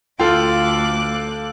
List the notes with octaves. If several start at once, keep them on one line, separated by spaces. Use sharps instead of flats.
D2 F4 A4 F5 G5 D6 F#6